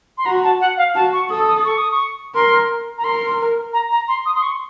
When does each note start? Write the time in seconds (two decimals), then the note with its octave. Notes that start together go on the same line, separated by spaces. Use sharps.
0.18 C6
0.26 F#4 A#5
0.43 A5
0.61 F#5
0.77 F5
0.95 F#4 A5
1.13 C#6
1.30 A4 D#6
1.48 D#6
1.65 C#6
1.78 D#6
1.91 C#6
2.35 A#4 C6
2.98 A#5
3.04 A#4 C6
3.73 A#5
3.91 A#5
4.08 C6
4.26 D#6
4.35 C6
4.42 C#6